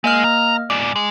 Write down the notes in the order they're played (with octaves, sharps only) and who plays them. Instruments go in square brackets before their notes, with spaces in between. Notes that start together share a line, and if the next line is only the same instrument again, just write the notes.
[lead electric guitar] G#3 [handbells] A#3 D#5 F6
[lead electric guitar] A#5
[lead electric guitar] G#2 D5 [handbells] D6
[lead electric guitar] G#3